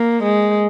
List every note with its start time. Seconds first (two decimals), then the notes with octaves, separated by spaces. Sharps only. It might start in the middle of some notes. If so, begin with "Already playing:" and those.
Already playing: A#3
0.24 G#3